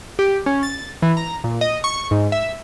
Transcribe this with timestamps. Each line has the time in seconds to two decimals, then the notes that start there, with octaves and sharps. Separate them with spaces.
0.19 G4
0.46 C#4
0.63 A6
1.02 E3
1.17 A#5
1.44 A#2
1.61 D#5
1.84 C#6
2.11 G#2
2.32 E5